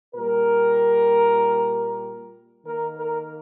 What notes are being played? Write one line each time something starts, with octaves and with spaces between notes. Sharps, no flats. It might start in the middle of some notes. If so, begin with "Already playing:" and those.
A#2 G3 A#3 A#4
D#3 A#3 A#4
A#4